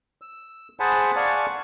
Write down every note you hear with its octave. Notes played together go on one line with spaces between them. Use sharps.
E6
G#4 C5 F#5 G#5 A5 B5
D5 F5 F#5 G#5 A5 C#6